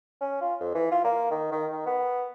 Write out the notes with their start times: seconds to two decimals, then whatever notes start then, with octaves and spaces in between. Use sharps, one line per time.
0.21 C#4
0.41 F4
0.60 F2
0.75 E3
0.92 F4
1.04 A#3
1.31 D#3
1.52 D#3
1.72 D#3
1.86 B3